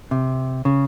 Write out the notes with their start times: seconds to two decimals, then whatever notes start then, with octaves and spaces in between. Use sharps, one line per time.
0.11 C3
0.65 C#3